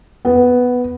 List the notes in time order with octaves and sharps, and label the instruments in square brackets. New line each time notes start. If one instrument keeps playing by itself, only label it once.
[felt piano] B3